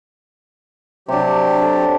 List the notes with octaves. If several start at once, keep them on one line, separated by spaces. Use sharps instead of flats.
C3 F#3 D4 G4
A4